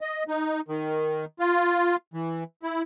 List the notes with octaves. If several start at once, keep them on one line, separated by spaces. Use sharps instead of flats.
D#5
D#4
D#3
F4
E3
E4